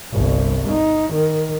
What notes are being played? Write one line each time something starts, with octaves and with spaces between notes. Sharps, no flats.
G1 C2
D#4
D#3